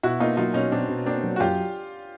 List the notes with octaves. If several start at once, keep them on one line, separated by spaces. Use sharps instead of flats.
B2 E4 F#4
A#3 D#4 F4
F#3 D#4 F4
B2 C#4 D#4
B2 C4 D4
B2
A#3 C4 D4
F#3
F#4
F#2 F4 G4